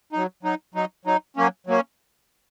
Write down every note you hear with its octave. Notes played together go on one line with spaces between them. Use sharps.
F#3 D#4
F#3 D#4
F#3 D#4
F#3 D#4
F#3 A#3 C#4
F#3 A#3 C#4